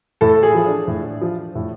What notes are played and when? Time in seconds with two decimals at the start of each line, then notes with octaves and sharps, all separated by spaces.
0.21 A2 A4
0.43 G#4
0.55 F3
0.66 D4
0.87 A2
1.21 F3
1.55 A2